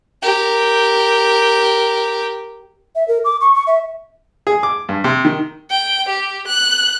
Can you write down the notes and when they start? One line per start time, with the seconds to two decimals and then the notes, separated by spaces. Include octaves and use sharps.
0.22 G4 A#4
2.95 E5
3.08 A#4
3.25 D6
3.41 C#6
3.55 C#6
3.67 E5
4.47 G#4
4.63 D6
4.89 G2
5.04 C3
5.25 D#3
5.70 G5
6.09 G4
6.47 F#6